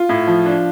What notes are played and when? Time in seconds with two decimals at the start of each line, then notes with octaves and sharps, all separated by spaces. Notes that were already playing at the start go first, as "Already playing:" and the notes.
Already playing: F4
0.09 A2
0.27 F3
0.46 D4